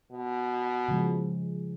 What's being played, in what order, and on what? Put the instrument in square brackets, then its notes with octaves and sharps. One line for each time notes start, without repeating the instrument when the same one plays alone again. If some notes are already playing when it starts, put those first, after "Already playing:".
[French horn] B2
[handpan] C#3 F3 G#3